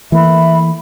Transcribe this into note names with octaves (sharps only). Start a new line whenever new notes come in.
E3 A3 A#3 E5 B5